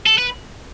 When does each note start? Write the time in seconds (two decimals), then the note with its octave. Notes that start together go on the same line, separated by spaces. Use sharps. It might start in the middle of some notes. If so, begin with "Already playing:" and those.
0.06 A4
0.18 B4